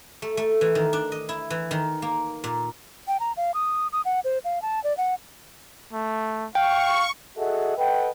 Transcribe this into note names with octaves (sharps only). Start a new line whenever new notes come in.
A3
A3
E3
D#3
D4
D#5
E4
E3
D#3
A#3
A#2
G5
A#5
F5
D#6
D#6
F#5
C5
F5
A5
D5
F#5
A3
F5 G5 C#6
F#4 G#4 A4 D#5 E5 F#5
A4 B4 D#5 F#5 G5